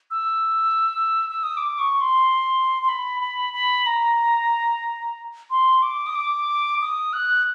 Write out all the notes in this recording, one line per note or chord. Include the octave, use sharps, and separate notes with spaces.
E6
E6
D#6
D6
C#6
C6
C6
B5
B5
B5
A#5
C6
D6
D#6
D6
D#6
F#6